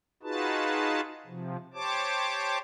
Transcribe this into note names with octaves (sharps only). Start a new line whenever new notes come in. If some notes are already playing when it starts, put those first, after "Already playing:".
D#4 F4 F#4 G#4 B4 A5
C3 F3
G4 C5 C#5 A5 D6